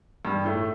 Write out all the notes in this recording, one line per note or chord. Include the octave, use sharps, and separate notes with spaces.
G2 G3
A2 A3